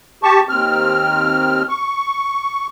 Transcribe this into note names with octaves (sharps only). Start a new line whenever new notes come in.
G4 A5 C#6
D#2 C4 F6
C#6